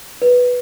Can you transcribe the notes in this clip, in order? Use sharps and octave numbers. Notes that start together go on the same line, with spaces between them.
B4